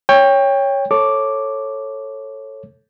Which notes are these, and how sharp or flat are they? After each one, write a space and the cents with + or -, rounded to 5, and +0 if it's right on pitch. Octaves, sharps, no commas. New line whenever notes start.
C#5 +0 G5 +20
A4 +0 C#5 -15 D6 +0